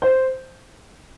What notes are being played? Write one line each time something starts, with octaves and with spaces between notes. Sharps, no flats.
C5